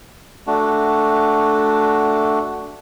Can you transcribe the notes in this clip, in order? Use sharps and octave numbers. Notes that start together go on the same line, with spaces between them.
A3 D4 F#4